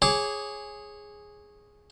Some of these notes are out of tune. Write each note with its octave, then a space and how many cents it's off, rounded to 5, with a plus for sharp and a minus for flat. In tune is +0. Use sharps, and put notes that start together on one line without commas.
G#4 +0 C#5 -15 D6 -15